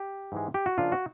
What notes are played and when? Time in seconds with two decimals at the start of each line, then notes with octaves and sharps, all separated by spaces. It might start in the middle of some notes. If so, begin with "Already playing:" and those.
Already playing: G4
0.32 G#2 E3 G#3
0.54 G4
0.66 F#4
0.78 C#3 F3 A#3 D4 F4
0.92 F#4